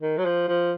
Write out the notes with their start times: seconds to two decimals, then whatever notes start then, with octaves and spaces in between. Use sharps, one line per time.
0.02 D#3
0.18 F#3
0.25 F3
0.48 F3